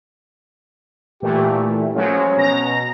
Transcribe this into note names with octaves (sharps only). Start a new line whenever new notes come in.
A#2 E3 A3 G4
F3 F#3 G#3 C#4
B2 A#5 A#6